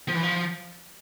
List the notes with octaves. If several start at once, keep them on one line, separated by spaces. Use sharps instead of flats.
F3
E3
F3